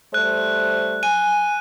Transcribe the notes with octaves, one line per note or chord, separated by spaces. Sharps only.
G3 A3 C5 F#6
G#5 D#7